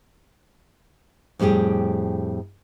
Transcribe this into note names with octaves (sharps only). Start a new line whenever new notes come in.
F2 A2 G3 G4 G#4